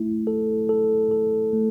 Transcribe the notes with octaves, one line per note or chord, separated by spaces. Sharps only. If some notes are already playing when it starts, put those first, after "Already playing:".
Already playing: A3 E4
A4
A4
A4
A3